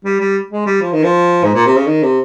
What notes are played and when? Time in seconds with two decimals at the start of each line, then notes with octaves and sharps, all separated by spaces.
0.05 G3
0.20 G3
0.51 G#3
0.66 G3
0.81 F3
0.92 D#3
1.04 F3
1.44 G#2
1.54 A#2
1.66 C3
1.76 C#3
1.87 D#3
2.03 C3